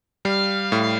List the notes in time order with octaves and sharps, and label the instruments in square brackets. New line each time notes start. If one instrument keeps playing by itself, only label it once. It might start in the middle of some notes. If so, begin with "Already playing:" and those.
[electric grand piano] G3 [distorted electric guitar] F5
[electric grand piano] A2